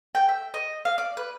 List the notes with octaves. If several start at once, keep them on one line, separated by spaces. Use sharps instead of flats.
G5
E5
D#5
F5
D5
B4